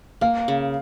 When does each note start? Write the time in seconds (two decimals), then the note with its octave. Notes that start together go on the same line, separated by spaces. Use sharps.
0.21 A#3 F5
0.48 C#3